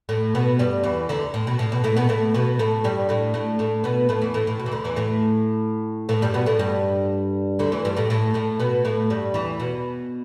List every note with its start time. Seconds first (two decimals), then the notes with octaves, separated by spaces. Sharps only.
0.09 A2 A3
0.35 B2 B3
0.59 G2 G3
0.83 E2 E3
1.09 D2 D3
1.34 A2
1.47 B2
1.59 A2
1.72 B2
1.84 A2 A3
1.96 B2 B3
2.09 A2 A3
2.34 B2 B3
2.59 A2 A3
2.84 G2 G3
3.09 A2 A3
3.34 A2 A3
3.59 A2 A3
3.84 B2 B3
4.09 A2 A3
4.21 E2 E3
4.34 A2 A3
4.47 A2
4.59 B2
4.66 E3
4.72 D2 D3
4.84 E2 E3
4.96 A2 A3
6.09 A2 A3
6.22 G2 G3
6.34 B2 B3
6.46 A2 A3
6.59 G2 G3
7.59 D2 D3
7.72 E2 E3
7.85 G2 G3
7.96 A2 A3
8.10 A2 A3
8.34 A2 A3
8.60 B2 B3
8.85 A2 A3
9.10 G2 G3
9.34 E2 E3
9.60 B2